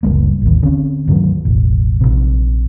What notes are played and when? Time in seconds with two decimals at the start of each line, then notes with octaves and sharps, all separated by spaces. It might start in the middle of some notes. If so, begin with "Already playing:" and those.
0.03 F#1 C#2 G3 A#3
0.42 A1 D#2
0.62 D3 C4 C#4
1.08 D2 G2 D#3 F#3
1.45 E1 A1
2.01 A#1 C3